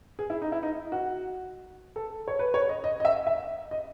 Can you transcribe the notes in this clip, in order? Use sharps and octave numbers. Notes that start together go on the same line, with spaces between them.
G#4
E4
D#4
E4
D#4
F#4
A4
C#5
B4
C#5
D#5
D#5
D#5
E5
E5
D#5